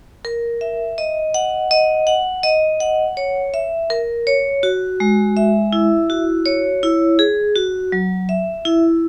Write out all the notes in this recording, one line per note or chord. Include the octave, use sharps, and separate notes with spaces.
A#4
E5
D#5
F#5
D#5
F#5
D#5
F#5
C#5
E5
A#4
C#5
F#4
G#3
E5
E4
F#4
C#5
E4
G#4
F#4
F#3
E5
E4